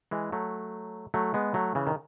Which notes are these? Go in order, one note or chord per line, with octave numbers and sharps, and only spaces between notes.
E3 G#3
F#3 A3
F#3 A3
G#3 B3
F#3 A3
C#3 E3
D#3